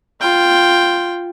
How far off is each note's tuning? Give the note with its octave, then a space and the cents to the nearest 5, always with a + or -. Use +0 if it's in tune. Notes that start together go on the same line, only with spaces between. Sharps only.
F4 +0 G5 +0